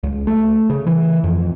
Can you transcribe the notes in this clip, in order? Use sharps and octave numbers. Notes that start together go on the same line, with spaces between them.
C#2
A3
C#3
E3
F2